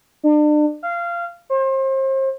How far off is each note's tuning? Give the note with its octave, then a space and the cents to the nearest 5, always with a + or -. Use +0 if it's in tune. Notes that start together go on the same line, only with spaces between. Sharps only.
D4 +35
F5 -20
C5 +35